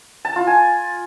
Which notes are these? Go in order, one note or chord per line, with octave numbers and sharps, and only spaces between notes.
A5
F4
G#5